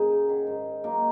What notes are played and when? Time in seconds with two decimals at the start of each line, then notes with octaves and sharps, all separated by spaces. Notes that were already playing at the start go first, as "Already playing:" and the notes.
Already playing: F#2 A#2 C#3 D#4 G#4
0.10 F#3
0.29 D#3
0.47 G#2
0.66 G#2
0.84 F#3 A#3 D#4